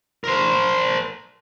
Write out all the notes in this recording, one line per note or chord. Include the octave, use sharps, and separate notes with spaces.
A#4 C5